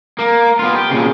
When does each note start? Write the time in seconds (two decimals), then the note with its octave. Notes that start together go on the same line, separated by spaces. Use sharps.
0.19 A#3
0.59 B3 F4
0.75 G4
0.91 A#2 C#3